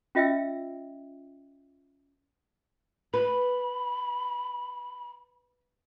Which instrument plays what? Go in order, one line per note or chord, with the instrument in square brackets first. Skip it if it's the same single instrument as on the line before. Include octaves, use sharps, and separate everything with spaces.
[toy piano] C#4 F4 D#5 E5 G5 E6
[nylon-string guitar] B4 [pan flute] B5